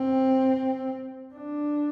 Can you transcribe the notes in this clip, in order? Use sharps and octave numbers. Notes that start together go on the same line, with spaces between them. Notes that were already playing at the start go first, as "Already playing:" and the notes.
Already playing: C4
D4